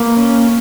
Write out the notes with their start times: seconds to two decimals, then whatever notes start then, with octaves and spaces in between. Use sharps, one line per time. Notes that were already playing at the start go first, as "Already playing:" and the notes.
Already playing: A#3 B4
0.17 C#4